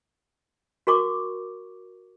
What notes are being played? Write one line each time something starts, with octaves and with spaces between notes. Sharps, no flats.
F#4 A#4 C#6 D6